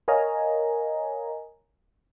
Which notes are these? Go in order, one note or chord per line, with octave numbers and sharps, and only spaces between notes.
A#4 C#5 D#5 F5 G#5 A#5